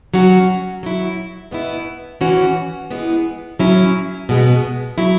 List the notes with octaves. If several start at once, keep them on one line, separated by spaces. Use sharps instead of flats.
F#3 C#4 F#4
F#3 E4
B2 B3 E4
E3 C#4 F#4
E3 G#3 B3
F#3 C#4 E4
B2 G#3 B3
F#3 E4